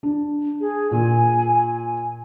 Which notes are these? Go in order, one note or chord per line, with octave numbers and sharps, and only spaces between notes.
D4
G#4
A#2 G#5